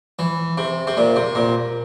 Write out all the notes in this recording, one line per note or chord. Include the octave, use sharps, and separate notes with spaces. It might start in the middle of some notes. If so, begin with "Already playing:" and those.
E3
C3
C3
A#2
C3
A#2